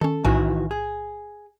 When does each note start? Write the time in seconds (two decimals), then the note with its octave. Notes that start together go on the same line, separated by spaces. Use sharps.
0.01 D#3 C#4 A4
0.25 B1 A2 D#3 E3 F#4 G#5
0.71 G#4